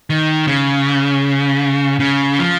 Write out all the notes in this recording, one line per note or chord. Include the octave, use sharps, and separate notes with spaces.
D#3
C#3
C#3
F3